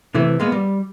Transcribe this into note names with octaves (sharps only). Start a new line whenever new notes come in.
C3 E3 A3
G#3 A#3 B3
G3